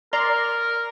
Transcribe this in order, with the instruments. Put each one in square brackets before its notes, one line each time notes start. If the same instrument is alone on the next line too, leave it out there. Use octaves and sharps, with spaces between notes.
[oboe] A#4 [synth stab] D5 A#5 C6